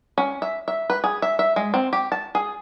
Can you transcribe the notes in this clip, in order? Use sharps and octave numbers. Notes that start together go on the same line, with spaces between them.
C#4
E5
E5
B4
G#4
E5
E5
G#3
C4
G4
A5
G#4